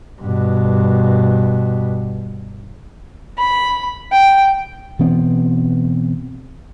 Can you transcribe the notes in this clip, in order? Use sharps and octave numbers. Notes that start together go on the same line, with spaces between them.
G2 B2
B5
G5
B2 E3 B3 C4